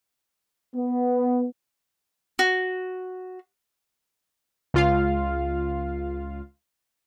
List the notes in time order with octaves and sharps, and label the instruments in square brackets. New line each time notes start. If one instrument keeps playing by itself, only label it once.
[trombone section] B3
[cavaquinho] F#4
[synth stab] C#2 F4 F5